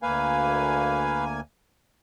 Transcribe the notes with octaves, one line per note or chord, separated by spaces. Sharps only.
D2 A#3 B4 F5 G#5